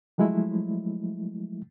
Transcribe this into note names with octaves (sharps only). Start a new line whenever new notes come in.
F3 F#3 G#3 A3 E4